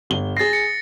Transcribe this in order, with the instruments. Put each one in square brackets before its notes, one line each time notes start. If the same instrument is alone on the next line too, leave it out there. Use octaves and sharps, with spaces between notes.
[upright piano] G1 G7
[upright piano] G#4 C7 [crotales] A6 A#6
[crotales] C#7